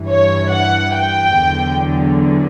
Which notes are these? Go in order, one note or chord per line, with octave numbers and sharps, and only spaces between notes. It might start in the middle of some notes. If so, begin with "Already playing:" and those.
Already playing: G2 E3
C#5
F#5
G5
E2 D3 F#3